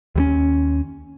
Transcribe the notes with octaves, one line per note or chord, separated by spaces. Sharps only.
D#2 G3 C#4